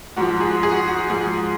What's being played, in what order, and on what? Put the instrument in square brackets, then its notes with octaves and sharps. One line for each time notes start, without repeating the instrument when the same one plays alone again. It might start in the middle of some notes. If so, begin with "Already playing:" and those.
[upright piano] G#2 F3 F#4
G#4
G#4
F#4
F#4
G#2 F3 G#4